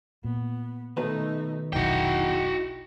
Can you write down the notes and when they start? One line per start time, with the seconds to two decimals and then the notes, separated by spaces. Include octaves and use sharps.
0.24 A#2 B3
0.97 B2 D#3 A3 D#4 B4
1.73 F1 B1 D#4 E4 F#4 G5